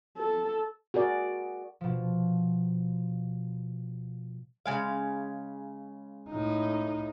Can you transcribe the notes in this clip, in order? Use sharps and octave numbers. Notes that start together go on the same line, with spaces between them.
A4
F#4 G#4 A#4 D5
B2 F3
C#3 G#3 F5
A2 D#4